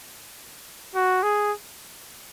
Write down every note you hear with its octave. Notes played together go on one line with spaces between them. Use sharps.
F#4
G#4